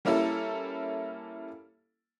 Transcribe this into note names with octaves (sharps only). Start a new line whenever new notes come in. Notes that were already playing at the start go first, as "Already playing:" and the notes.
G3 A#3 C#4 E4 A4